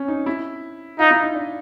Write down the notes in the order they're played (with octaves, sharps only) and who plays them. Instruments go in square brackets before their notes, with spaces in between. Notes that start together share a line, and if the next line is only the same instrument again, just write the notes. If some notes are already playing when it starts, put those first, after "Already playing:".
Already playing: [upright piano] C4 C#4
D#4
E4
[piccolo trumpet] D#4 [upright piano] F4
[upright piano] E4
D#4
D4